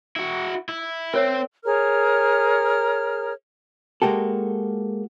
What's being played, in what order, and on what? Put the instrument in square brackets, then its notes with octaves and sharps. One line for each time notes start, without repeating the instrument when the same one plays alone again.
[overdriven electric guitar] E4 F#4
E4
[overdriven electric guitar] C4 [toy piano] A#4 C#5 E5
[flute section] G#4 A#4 C#5 F6
[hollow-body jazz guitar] G#3 A#3 F#4 G4 A4